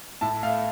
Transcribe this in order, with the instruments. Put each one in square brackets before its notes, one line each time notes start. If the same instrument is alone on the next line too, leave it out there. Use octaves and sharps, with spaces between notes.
[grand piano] A2 A5
A3 F5